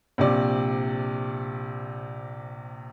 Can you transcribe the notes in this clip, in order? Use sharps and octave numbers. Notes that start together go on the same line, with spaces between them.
A#1 C3 D5